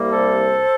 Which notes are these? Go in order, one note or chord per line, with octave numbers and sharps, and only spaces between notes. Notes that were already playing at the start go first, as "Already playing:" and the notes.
Already playing: C2 C3 G3 A#3
A4 C5